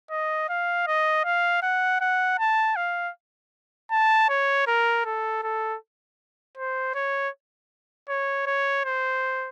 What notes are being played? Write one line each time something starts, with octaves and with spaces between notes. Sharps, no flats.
D#5
F5
D#5
F5
F#5
F#5
A5
F5
A5
C#5
A#4
A4
A4
C5
C#5
C#5
C#5
C5